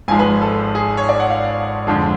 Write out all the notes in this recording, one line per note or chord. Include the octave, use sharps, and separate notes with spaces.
G#1 G#2 F3 G#3 G#5
B4
A4
G#4
C#5
D5
F#5
F5
F2 D3 F3 G#3